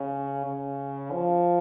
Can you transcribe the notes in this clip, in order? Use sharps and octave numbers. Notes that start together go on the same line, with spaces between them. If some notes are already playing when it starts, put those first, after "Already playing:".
Already playing: C#3
C#3
F3